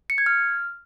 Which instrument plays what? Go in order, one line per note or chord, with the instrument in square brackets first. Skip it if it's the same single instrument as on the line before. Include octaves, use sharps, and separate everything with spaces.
[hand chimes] C#7
G#6
F6